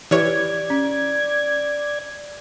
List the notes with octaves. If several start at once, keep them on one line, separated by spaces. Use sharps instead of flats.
E3 E4 G4 B4 C#5 D5 G#6
C#4